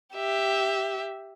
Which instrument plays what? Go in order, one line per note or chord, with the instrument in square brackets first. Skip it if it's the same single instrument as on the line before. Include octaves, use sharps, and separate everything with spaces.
[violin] G4 E5